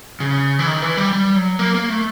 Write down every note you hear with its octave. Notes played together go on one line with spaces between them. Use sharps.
C#3
E3
D#3
E3
G3
G3
F#3
A#3
A#3
A3